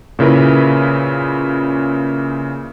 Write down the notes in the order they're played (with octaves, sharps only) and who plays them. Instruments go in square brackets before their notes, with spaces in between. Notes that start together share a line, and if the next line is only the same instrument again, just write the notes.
[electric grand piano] A#2 C#3 E4 A#4 B4